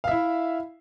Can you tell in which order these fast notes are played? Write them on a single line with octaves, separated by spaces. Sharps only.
F5 E5 E4